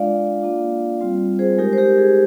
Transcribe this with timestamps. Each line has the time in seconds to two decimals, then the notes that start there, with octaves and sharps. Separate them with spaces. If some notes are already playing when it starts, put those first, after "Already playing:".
Already playing: G#3 D4 F4 D5 F5
0.41 A#3 D4 F4
1.01 G3 C4 F4
1.39 G#4 C5
1.58 G#3 D#4 G4 A#4
1.73 C5
1.78 G4 A#4
1.98 G#4